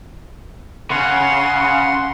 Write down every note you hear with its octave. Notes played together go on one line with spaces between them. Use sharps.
C#3 F#5 C6